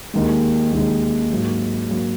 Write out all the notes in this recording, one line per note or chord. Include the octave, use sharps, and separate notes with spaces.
D#2 D#3 G#3
D#2 D#3 G#3
G#2 F#3 A#3
F#3 A#3